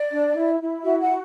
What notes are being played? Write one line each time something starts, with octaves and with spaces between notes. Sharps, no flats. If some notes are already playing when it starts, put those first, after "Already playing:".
Already playing: D5
D4
E4
E4
F#4 E5
F#5
F#4